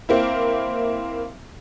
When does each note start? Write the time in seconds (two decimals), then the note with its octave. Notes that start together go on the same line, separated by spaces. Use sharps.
0.09 A#3 C4 E4